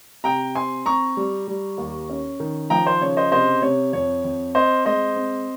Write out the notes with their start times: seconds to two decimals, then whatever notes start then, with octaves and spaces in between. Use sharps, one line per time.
0.24 C3 G5 A#5
0.55 C4 G#5 C6
0.86 C4 A#5 C#6
1.17 G3
1.47 G3
1.78 D#2
2.10 C#4
2.40 D#3
2.70 F3 G5 A#5
2.86 C5
3.01 C#3 C#5
3.17 C5 D#5
3.31 C3 C5 D#5
3.62 C3 C#5
3.93 F2 C#5
4.24 F2
4.55 C4 C5 D#5
4.85 G#3 C5 D#5
5.16 C4